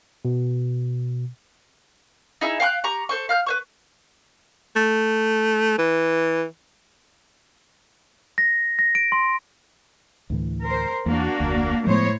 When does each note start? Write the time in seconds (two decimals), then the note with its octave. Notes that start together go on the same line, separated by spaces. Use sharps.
0.25 B2
2.41 D#4 E4 G#4 E5
2.60 F5 G5 C#6 F#6
2.84 G4 A#5 C#6
3.09 A4 C5 C#6
3.29 F5 F6 G6
3.46 B4 C5 C#6
4.76 A3
5.78 E3
8.38 A#6
8.79 A#6
8.95 D7
9.12 C6
10.30 D2 A2 E3
10.64 A#4 C5
11.06 E2 A#3 D4 F#4
11.40 F1 D2
11.87 A2 F3 G#3 B3 C5 C#5